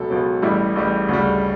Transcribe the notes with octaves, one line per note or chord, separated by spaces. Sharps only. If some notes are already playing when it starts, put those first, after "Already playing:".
Already playing: C#2 B2 F#3 A4
C#2 B2 F#3
A1 A2 G3 E4
A1 A2 G3
D2 C#3 G3